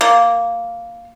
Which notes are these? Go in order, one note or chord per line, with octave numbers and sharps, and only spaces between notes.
A#3